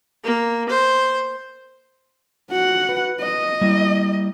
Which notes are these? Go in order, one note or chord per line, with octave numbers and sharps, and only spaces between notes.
A#3
C5
F#4 F#5
B4
D#5
G3 A#3 E4